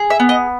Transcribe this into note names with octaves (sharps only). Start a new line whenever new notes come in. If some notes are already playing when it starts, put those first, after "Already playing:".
Already playing: G#4
E5
B3
D#5